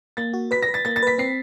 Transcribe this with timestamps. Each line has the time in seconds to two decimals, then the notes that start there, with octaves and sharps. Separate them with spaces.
0.17 A#3 A6
0.34 F#4
0.51 B4 B6
0.62 A#6
0.68 B4
0.74 A6
0.85 A#3 A6
0.96 A6
1.03 B4 B6
1.18 C4 C7